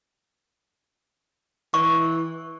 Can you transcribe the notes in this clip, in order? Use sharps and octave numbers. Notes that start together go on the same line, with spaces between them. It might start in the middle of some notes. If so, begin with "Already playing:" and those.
E3 C#6